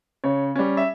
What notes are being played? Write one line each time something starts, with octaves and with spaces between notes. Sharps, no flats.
C#3 C#5
G3 C#4
E5